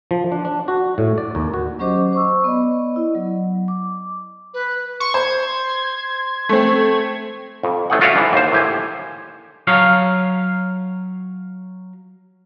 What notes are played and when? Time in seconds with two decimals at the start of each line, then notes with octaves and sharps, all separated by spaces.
0.11 F3
0.32 D4
0.45 D4
0.68 F#4
0.98 A2
1.18 D5
1.35 D#2
1.54 F#4
1.79 F#3 C#4 G4 C5 D#5 D6
2.13 C5 C#6 E6
2.44 B3 D5 D#5
2.96 E4 D#5
3.15 F#3
3.68 D6
4.54 B4
5.00 C6 C#6
5.14 C5 G#6
6.49 A3 C4
7.63 F2
7.90 A1 A3 G#4 F#5
8.01 F4 F#4 C#5 D5 E5 F5
8.16 G#2 D3 E3
8.33 D#2 C5
8.52 A2 G4 G#5
9.67 F#3 C#5 F5